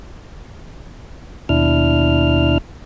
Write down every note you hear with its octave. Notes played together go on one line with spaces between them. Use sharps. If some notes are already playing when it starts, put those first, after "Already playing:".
D#2 B2 D4 E4 F6